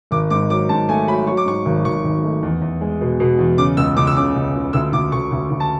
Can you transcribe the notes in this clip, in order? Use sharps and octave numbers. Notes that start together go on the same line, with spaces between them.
G#1 D6
G#2 D6
F#3 D6
G#2 A5
A3 G#5
F#3 B5
F#3 C#6
D6
G#2 C#6
G#1
G#1 C#6
G#1
A3
E2
E2
G#3
B2
B2
E2
C#3 D6
C#2 E6
C#2 D6
E6
C#3 D6
C#2
C#2
D2 E6
D2 D6
D2 C#6
D2
D2
A5